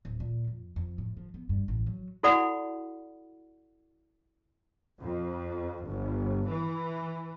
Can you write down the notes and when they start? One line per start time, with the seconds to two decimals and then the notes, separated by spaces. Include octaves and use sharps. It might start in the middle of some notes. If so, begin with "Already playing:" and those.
0.05 D1
0.20 A#2
0.47 F2
0.76 F2
0.98 A2
1.17 F3
1.34 B3
1.49 G2
1.68 A1
1.87 F#3
2.23 E4 F#4 A4 D5 F#5 B5
5.01 F2
5.88 G1
6.49 E3